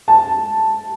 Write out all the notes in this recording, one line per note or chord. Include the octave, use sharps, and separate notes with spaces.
A5